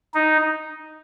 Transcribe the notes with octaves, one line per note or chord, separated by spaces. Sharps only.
D#4